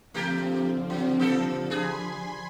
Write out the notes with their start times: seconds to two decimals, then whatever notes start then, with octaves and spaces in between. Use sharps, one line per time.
0.14 D3 F3 A3 A#3 C4 G4
0.90 F#3
1.19 A#3 G4 A4
1.70 D4 G#4 G#5 B5 C6